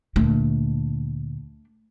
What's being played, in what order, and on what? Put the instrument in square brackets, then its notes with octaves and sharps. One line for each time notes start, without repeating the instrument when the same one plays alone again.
[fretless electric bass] D2 A#2 [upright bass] A3 D4